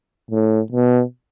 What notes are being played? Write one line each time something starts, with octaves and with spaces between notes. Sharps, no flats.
A2
B2